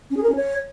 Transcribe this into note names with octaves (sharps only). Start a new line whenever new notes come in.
C#4
G#4
A#4
C#4
C#5